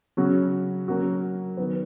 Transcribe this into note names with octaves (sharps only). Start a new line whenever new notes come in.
C#3 F#3 C#4 F#4
F#3 A#3 C#4 F#4
D#3 F#3 B3